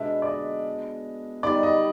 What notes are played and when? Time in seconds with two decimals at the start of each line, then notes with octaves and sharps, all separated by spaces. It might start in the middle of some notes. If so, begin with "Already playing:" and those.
Already playing: B2 G#3 B3 D4 E5
0.22 D5
0.28 D#5
1.43 D#3 G3 B3 D5
1.63 D#5